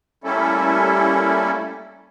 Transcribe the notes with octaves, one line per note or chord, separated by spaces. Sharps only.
G3 A3 A#3 C#4 E4 A4